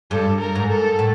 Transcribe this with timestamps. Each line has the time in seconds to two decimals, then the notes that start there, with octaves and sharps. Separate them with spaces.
0.11 G2 A4
0.40 A#4
0.55 G#2
0.70 A4
0.99 A2